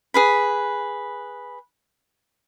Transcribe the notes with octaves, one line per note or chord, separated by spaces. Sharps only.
G#4 B4 B5